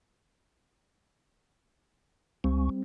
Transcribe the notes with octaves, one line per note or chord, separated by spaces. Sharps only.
C#2 G3 C4